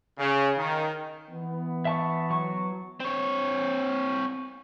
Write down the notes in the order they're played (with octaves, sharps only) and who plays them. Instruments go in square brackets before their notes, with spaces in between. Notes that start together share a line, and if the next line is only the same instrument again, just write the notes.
[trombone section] C#3
D#3
[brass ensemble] E3 B3
[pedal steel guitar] E5 A5 C#6
F#3 C#6
[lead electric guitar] C4 C#5